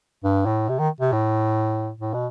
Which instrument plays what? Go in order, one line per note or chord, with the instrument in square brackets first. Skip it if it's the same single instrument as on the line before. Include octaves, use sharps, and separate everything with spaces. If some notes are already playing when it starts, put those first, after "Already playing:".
[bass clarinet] G2
A2
C3
D#3
C3
A2
A2
B2